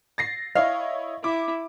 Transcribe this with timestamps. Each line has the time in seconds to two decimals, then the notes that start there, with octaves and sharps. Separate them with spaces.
0.18 A6 A#6 C7
0.55 E4 C#5 D#5 F5
1.24 E4 D6